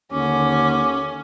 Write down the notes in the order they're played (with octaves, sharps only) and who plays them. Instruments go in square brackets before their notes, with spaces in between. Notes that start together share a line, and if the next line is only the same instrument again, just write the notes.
[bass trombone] D#2 [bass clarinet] D3 [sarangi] C#4 [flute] D6